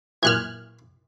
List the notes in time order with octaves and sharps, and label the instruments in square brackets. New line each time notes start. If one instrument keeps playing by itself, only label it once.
[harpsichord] F#2 A#2 E3 [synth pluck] F6 F#6 G#6